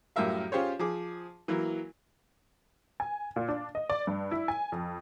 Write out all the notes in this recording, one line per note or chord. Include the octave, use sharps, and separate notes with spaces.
F#2 A2 G3 A#4 E5 F5
C#4 F4 G4 G#4 C5 C#5
F3 G#4 D6
E3 F#3 A#3 E4
G#5
A#2
D4
D#5
D5
G2
E4
G#5
F2